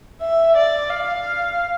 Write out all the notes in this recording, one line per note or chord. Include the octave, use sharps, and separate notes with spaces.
E5
D5
F5